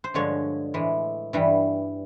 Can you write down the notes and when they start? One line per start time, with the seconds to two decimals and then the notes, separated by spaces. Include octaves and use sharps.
0.04 C5
0.14 G2 D3 F3 G#3 C#5
0.74 A2 E3 G#3
1.33 G2 E3 G3